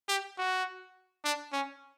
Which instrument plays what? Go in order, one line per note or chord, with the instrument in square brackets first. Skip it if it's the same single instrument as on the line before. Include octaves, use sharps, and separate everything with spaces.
[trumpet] G4
F#4
D4
C#4